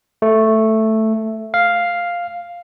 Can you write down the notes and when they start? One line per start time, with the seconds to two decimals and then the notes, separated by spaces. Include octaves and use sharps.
0.22 A3
1.54 F5